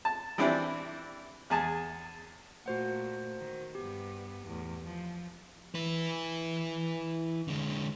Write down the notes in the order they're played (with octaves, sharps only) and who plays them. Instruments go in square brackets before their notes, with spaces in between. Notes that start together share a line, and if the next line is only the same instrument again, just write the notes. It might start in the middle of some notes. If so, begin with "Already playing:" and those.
[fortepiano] A5
E3 G3 C4 D4 E4 G4
E2 G#4 A5
[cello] A#2 A3 [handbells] F#4 C5 F#5
[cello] D#3
[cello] G2 B3 [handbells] G4
[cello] E2 A2
F3
[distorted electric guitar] E4 B4
D3 G#3